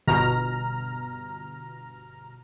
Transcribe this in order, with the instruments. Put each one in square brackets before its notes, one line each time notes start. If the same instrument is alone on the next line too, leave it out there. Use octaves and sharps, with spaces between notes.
[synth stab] G1 B2 A#5 F6